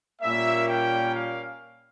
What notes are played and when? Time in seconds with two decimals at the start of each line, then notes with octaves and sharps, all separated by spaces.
0.22 A#2 G3 A#3 C#4 E5
0.68 G5
1.14 F5